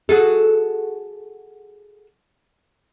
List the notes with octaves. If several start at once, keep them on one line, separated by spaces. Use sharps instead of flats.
F#4 G#4 A4